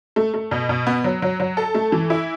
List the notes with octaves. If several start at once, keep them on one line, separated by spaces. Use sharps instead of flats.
A3
A3
B2
B2
B3
F#3
F#3
F#3
A4
A3
E3
E4